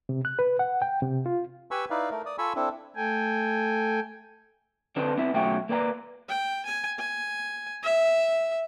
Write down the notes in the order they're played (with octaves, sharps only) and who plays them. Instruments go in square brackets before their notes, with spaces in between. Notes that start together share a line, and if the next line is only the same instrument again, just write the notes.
[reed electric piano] C3
F#6
B4
F#5
G5
C3
F4
[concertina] G4 B4 G#5 B5 C#6 E6
D#4 E4 B4 D5 F5
A3 A#4
D5 D#6
F4 A4 G#5 B5 C#6 E6
C4 D4 E4 A4
[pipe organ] A3 A4 G5 G#5
[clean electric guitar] D3 C4 D4 A4 B4 C5
B3 C4 E4 E5
B1 A3 C#4 F#4 E5 G5
A#3 B4 D5 G5 A#5
[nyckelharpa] G5
G#5
G#5
E5